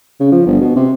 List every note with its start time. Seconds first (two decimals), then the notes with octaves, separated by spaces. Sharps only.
0.20 C#3
0.32 F3
0.46 G1
0.61 B2
0.76 C3